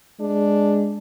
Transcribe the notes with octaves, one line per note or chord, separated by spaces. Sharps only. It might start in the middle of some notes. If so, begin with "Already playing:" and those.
G#3 D4